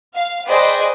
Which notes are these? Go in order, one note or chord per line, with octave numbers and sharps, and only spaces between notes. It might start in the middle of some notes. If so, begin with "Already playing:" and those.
F5
G#4 B4 C5 D5 D#5 G5